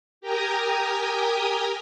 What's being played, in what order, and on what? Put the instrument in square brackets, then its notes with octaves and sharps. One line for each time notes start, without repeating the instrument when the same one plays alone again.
[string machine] G4 A#4 G5 G#5 A#5 D#6